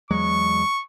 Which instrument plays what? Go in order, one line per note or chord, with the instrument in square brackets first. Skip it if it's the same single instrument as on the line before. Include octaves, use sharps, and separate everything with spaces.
[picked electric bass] E2 F#3 G#3 [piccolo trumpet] C#6